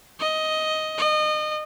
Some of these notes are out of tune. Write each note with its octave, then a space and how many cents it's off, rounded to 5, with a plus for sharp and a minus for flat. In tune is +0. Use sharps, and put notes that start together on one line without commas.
D#5 +10
D#5 -30